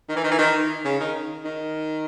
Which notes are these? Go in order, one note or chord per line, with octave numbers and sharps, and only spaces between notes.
D#3
E3
D#3
E3
D#3
C#3
D#3
D#3